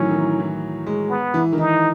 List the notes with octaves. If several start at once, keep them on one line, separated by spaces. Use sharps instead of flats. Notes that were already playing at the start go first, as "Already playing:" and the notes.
Already playing: A2 D#3 E3 F#3 C#4
D#3
E3
E3
G#3
B3
E3
D#3
E3 D#4